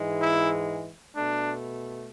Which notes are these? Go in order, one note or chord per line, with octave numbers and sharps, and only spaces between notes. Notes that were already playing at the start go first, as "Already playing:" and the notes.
Already playing: G#2 E3 G#3
E4
B2 A3 D4